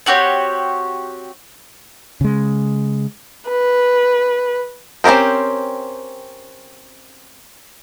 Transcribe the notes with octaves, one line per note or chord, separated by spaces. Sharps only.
C4 F#4 G4 C#5
C#3 G#3
B4
C4 C#4 G4 A#4 C5